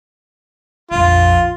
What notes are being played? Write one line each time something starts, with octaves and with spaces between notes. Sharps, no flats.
A#1 F2 F4